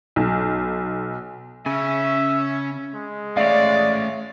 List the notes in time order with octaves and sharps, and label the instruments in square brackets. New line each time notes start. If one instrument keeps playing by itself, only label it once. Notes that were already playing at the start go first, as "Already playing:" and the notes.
[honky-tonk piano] B1
[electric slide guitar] C#3 [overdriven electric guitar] C#4 G#5 [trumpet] E5
[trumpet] G#3
[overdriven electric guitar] A3 C#4 [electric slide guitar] C#5 E5 F5 [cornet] D5